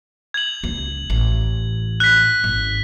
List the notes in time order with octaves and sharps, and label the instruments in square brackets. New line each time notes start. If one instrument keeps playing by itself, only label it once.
[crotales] G#6 F#7
[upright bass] C#2
A1
[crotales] F#6 B6
[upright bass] G#1